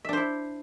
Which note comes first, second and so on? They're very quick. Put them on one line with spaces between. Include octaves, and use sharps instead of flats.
E5 D4 C5 E4